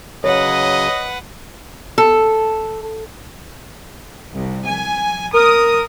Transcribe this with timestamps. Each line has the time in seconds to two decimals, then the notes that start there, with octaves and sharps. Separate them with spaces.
0.24 C#3 F#3 B4 C#5 D#5 F#5
1.98 A4
4.34 C2
4.66 G#5
5.35 A#4 D#6